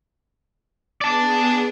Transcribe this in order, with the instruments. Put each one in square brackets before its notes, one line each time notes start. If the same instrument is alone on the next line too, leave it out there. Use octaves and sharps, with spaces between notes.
[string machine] B3 G#4 [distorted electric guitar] D5 A5